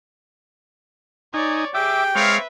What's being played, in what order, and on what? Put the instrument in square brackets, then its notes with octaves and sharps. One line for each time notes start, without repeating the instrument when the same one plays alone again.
[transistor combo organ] D#4 G#5 [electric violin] C#5 D5
[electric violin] G4 G#4 [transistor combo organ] E5 D6 [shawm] G5
[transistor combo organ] G#3 [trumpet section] C4 C#5 F5 [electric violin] B4 E5